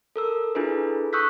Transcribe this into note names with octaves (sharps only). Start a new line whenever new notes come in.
A4 A#4 E6
D4 E4 F4 G#4 A4 B4
C#6 D#6 E6 F#6 G6 B6